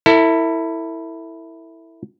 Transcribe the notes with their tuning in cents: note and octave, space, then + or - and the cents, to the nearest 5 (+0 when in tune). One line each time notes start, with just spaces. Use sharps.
E4 -5 A4 +40